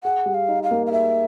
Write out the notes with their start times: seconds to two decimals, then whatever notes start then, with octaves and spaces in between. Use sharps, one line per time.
0.04 G#4 F#5
0.26 G3
0.34 F5
0.48 D#4
0.63 F5
0.71 A#3
0.86 F5
0.92 G#4 E5